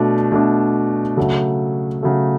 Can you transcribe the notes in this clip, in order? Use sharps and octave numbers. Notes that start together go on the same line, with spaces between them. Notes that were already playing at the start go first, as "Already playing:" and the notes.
Already playing: B2 A3 D4
B2 A3 D4
C#3 F#3 A3
C#3 F#3 A3